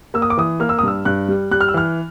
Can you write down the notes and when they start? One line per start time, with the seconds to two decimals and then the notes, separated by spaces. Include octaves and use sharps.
0.14 A#3 E6
0.22 D#6
0.30 D6
0.37 E3 D#6
0.60 A#3 F6
0.69 E6
0.79 D#6
0.83 G2 E6
1.05 G2 F#6
1.29 G3
1.51 G3 F#6
1.61 F6
1.68 E6
1.74 E3 F6